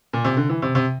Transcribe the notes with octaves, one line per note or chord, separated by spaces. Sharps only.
A#2
C3
D3
E3
C3
C3